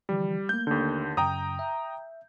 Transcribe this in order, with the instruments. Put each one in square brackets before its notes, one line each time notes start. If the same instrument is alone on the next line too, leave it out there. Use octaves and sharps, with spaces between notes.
[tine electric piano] D3 E3 F3 [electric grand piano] G3
[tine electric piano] A3 A#3 [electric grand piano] G6
[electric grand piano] D#2 D3
[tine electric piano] F#2 C#3 [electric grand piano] G5 A#5 D#6
[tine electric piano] E5